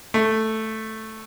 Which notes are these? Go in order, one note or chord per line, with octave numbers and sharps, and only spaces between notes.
A3